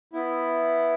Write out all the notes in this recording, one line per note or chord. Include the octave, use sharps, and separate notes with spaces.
B3 E4